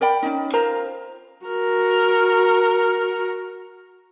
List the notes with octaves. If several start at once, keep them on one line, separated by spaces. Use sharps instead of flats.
A#4 D5 G5 B5
C#4 D#4
F4 A#4 C5 A#5
F#4 A#4